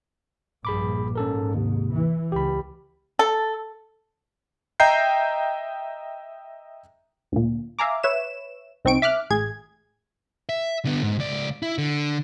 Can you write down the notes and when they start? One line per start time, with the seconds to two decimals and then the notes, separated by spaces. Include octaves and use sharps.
0.65 A#1 G2 G#4 B5 D6
1.15 G#2 C#4 A4 A#4
1.54 D#2 C3
1.94 E3
2.32 C#2 G4 B5
3.19 A4
4.80 D#5 E5 G5 A#5 G6 C7
7.32 D2 A#2
7.79 E5 F5 G#5 A#5 D6
8.03 B4 C#5 E5 E7
8.85 C2 C4 D#4 C#6 D7
9.02 E5 D6 F6 F#6
9.30 A1 G#4 G#6
10.49 E5
10.85 D3 B3
11.03 G#2
11.19 C#2 D5
11.62 E4
11.78 D3